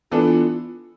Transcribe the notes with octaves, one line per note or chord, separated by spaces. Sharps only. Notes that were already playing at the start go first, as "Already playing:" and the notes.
E3 B3 D4 F4 A4